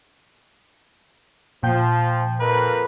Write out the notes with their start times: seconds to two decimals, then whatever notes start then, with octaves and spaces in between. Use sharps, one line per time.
1.63 A#2 F3 G5 G6
2.39 F2 A#4 B4